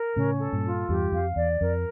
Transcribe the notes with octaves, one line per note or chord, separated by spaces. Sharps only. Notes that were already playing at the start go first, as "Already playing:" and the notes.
Already playing: A#4
A2 C#3 C#4
A4
G2 A#2
F4
E2 G2 G4
F2 F5
E2 D5
F2 A#4